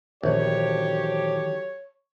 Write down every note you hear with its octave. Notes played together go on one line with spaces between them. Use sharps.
A#1 D#3 E3 F#3 A3 B3 G4 C#5